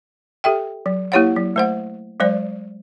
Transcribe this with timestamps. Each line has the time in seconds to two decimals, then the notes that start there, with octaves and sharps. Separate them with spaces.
0.44 G4 A4 E5 G5
0.86 F#3
1.12 A#3 E4 G4 C#5 F5 F#5
1.36 F#3
1.56 A3 C5 F#5
2.20 F#3 G#3 C5 D5